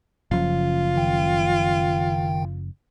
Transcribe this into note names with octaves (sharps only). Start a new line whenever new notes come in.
F#1 C#3 F3 F4
D#3 G5